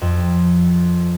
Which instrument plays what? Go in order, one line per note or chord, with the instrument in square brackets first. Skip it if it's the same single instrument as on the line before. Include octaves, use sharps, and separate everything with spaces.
[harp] F2